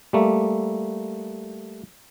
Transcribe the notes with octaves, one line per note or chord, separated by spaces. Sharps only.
G3 A3 A#3